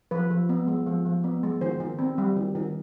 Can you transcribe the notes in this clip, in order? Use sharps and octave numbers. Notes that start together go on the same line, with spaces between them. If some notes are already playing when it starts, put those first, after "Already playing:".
F3 B4
F3
B3
G#3
F3
F3
B3
G#3
D#3 C5
D#3
C4
G3
D#3
D#3